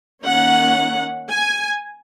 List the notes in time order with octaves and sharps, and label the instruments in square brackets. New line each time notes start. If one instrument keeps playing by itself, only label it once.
[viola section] D#3 A#3 C#4 F#5
G#5